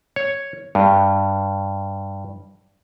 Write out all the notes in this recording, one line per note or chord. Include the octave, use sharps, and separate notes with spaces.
C#5
G2